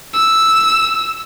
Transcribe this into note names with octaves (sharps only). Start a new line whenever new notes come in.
E6